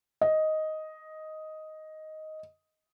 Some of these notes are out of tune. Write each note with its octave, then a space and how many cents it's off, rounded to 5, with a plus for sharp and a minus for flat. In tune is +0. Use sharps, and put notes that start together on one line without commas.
D#5 +5